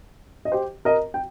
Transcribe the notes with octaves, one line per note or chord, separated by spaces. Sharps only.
D#5
G4 C5
A#4 D#5
G5